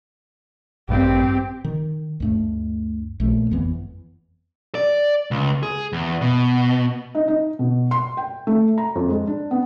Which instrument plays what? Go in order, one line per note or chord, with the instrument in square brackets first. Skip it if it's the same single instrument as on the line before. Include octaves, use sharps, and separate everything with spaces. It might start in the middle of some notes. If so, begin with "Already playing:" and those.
[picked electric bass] A1 G2 [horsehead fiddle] C4 G4
[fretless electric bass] D#3
D2 G2 A3
A#1 A3
G1 F2 E3 B3
[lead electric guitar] D5
C#2
G#4
E2
B2
[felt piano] D#4
D#4
B2
C6
G5
A3
A#5
F2
G#3
D4
B3